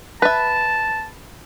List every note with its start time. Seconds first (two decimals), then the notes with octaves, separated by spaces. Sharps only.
0.22 B4 E5 A5